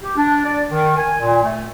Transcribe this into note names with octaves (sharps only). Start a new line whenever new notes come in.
G4
D4
D5
D#3
G#5
A#2
A3